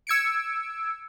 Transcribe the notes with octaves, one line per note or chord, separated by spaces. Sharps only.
E6 G#6 C#7 D7